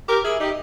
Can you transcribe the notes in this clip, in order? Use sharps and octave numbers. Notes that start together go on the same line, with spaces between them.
G4 A#4
E4 G#4
D#4 G4